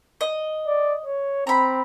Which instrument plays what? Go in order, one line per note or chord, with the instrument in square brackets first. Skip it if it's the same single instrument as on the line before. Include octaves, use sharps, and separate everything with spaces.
[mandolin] D#5
[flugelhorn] D5
C#5
[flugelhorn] C4 [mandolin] A#5 B5